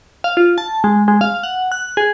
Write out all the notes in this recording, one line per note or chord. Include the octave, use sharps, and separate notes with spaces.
F5
F4
A5
G#3
G#3
F5
F#5
F#6
G#4